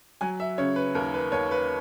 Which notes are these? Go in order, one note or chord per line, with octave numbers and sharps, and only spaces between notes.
F#3 G#5
E5
C#3 C#5
B4
D#2 A#4
B4
D#2 C#5
B4